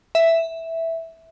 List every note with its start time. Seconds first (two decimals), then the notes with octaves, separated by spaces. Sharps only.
0.15 E5